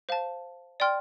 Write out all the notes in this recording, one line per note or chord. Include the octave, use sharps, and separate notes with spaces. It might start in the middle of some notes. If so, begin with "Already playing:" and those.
C5 F5 A5
D5 G5 C6 F6